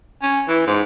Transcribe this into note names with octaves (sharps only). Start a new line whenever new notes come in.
C#4
E3
G#2